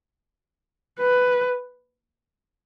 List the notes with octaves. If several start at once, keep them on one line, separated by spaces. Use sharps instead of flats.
B4